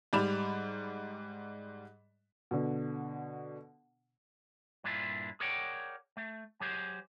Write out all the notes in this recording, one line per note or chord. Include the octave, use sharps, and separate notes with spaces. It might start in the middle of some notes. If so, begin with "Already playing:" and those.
G#2 G3 D5 B5 E7 F7
B2 D3
G2 A#2 D4 E4 F4
G#4 A#4 C#5 D5 F#5 G5
A3
F#3 G4 G#4 C5